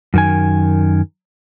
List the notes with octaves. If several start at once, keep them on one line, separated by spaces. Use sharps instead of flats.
F#2 D#3 G#5